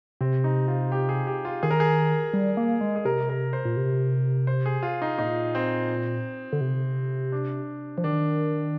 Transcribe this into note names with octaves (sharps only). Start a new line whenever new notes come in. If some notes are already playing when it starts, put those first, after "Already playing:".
C3 C4
D#4
F4
G4
G#4
G4
F4
D#3 G#4
A#4
G#4
G3
A#3
G#3
G#4
C3 A#4
A#4
C5
A#2
C3
C5
G#4
F4
D#4
A#2 D#4
C4
D3
C3
D4
F3
D#3 D4